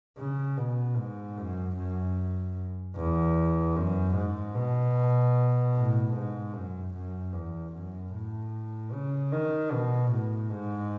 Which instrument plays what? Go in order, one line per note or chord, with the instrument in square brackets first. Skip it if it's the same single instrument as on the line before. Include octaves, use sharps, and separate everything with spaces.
[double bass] C#3
B2
G#2
F#2
F#2
E2
F#2
G#2
B2
A2
G#2
F#2
F#2
E2
F#2
A2
C#3
D#3
B2
A2
G#2